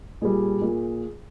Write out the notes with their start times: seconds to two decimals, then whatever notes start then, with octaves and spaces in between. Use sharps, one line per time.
0.22 A#2 G3 G#4
0.61 A#2